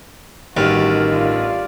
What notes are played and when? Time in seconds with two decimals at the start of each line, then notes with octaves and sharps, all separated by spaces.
0.57 A1 G2 D#3 F#4 F6
1.13 F4 D5